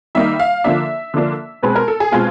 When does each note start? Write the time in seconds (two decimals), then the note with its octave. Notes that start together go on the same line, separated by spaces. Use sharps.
0.15 D#3 G3 A#3 D#4 E5
0.39 F5
0.64 D3 F3 A#3 D4 E5
1.14 D3 F3 A#3 D4
1.63 B2 G#3 C4 B4
1.76 A#4
1.88 A4
2.00 G#4
2.12 B2 G#3 C4 F4